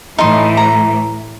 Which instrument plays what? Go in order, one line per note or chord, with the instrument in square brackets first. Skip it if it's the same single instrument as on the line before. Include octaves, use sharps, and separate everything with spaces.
[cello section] A2 E3 [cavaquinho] D#4 C6
[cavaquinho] A#5